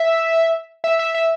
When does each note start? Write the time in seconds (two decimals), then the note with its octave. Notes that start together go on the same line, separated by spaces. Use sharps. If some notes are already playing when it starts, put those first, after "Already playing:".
Already playing: E5
0.84 E5
0.99 E5
1.14 E5